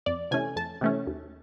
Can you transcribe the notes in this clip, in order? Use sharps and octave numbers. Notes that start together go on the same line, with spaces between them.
F2 D5
C3 E3 A3 C#4 G#5
F2 A5
C3 E3 A3 C#4
D#2